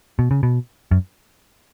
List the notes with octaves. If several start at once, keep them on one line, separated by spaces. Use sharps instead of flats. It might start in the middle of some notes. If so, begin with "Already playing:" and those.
B2
C#3
B2
F#2